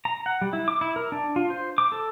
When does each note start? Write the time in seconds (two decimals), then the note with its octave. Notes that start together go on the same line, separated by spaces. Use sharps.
0.05 A#5
0.26 F#5
0.42 G3
0.53 E4
0.68 D6
0.81 E4
0.96 A#4
1.12 D4
1.36 F4
1.50 C5
1.78 D6
1.92 A4